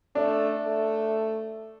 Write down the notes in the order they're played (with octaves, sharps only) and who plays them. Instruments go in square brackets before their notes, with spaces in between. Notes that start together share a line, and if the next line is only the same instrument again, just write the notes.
[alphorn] A3 [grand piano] D4
[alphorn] A3